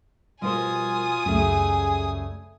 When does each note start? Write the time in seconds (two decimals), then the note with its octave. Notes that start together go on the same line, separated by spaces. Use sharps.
0.42 B2 F3 G3 F4 A#4 C5 G#5 D#6
1.26 C#2 F#2 C#3 G3 A3 G#4